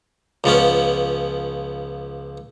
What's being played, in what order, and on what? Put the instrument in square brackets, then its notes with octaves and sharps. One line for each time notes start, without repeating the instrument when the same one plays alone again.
[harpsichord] C#2 F3 B3 C#4